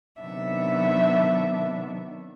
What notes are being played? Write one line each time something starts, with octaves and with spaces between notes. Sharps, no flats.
C3 D#3 F#3 B3 D4 E5